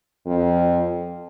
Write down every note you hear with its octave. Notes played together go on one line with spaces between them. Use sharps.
F2